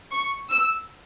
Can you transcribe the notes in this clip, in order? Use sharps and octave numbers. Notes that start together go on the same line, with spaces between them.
C#6
E6